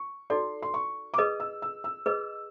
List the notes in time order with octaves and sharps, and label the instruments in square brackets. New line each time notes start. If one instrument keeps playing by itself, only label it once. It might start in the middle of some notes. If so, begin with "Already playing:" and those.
Already playing: [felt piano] C#6
[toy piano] D#4 F#4 A4 D5 [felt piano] C6
[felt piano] C6
C#6
D6
[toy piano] G#4 B4 D#5 [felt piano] D#6
[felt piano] E6
E6
E6
[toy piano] G#4 B4 D#5 [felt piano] E6